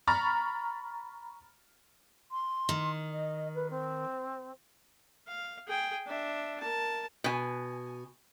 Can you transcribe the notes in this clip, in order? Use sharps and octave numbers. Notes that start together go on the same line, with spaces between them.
A#5 B5 C#6 F6 A6
C6
D#3
D#5
B4
C4
F5
G#4 G5
D4 E5
A#4 A5
B2 G#5